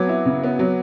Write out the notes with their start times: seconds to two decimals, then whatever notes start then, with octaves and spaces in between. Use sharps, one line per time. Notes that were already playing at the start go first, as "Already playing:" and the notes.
Already playing: F#3 B3 D6 G#6
0.09 E4
0.25 C#3
0.43 B3
0.59 F#3